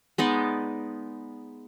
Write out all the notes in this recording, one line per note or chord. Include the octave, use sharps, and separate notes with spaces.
G#3 B3 D#4 D5